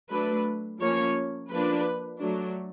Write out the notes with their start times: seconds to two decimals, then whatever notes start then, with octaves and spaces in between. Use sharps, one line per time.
0.10 F#3 A3 D4 B4
0.80 F3 A#3 C#4 C#5
1.49 F3 A#3 D4 B4
2.20 F#3 A3 D4